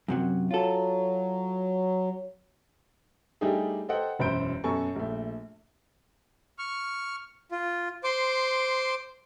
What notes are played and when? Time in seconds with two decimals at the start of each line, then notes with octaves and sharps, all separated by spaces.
0.08 F#2 C3 F#3
0.51 F#3 F4 A4
3.41 G3 A3 D4 D#4 G4 G#4
3.89 A4 B4 C5 D#5 F#5 G5
4.19 E1 F#2 C5 B5 G6 D7
4.64 F#2 B2 A4 G#5 C#6
4.96 A#1 A3
6.58 C#6 F6
7.52 F4
8.04 C5 C6 D6